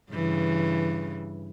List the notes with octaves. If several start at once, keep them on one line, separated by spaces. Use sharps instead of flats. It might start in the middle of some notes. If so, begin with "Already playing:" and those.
G2 C#3 E3